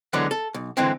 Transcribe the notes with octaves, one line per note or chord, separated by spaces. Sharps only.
D3 E3 F#3 G#3 B3
A4
B1
D3 E3 G#3 C4